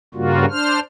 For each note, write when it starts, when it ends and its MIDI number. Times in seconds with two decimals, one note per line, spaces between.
0.15 0.45 43
0.15 0.45 49
0.15 0.45 55
0.15 0.45 58
0.15 0.45 65
0.15 0.45 66
0.50 0.80 62
0.50 0.80 72
0.50 0.80 89